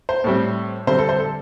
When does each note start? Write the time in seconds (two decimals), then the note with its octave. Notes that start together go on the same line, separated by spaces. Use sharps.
0.09 C5
0.24 A2 G3 C4
0.87 D3 G3 C4 C5
0.99 A4
1.09 C5
1.19 A4